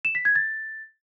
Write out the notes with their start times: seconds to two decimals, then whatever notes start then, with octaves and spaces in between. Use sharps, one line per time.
0.05 E7
0.15 B6
0.25 G#6
0.36 A6